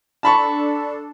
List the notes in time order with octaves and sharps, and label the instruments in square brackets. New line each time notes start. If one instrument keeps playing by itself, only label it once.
[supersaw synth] D4 A4 [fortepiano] A5 B5 C#6